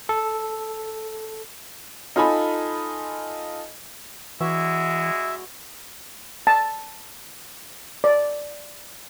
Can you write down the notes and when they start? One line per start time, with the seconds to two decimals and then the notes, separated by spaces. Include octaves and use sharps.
0.09 A4
2.16 D#4 F4 A4 G#5 B5
4.41 E3 G#3 E4 F#4 D5 E5
6.47 A5
8.04 D5